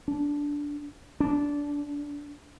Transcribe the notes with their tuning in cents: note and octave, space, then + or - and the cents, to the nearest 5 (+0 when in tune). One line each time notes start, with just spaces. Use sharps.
D4 -10
D4 -20